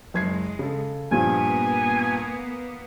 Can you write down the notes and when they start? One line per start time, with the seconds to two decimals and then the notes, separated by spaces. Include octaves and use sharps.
0.14 F#1 G#3 G#6 C7
0.59 C#3 A4
1.11 G2 A#2 F3 A#3 B3 G#5